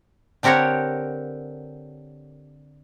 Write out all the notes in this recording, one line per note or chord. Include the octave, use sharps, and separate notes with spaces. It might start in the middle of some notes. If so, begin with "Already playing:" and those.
D3 C4 G4 A#4 C#5 F#5